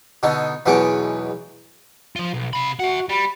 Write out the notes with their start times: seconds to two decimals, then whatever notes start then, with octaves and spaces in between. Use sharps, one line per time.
0.23 B2 D3 D#4
0.66 B1 E2 B2 G#3 F#5 D6
2.16 F3 F4
2.34 B1
2.53 C3 B5
2.80 F#4 E5 F#5
3.09 G3 B5